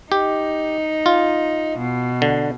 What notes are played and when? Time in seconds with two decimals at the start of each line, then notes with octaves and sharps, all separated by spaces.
0.12 D#4 G4
1.06 F4
1.79 B2
2.22 D3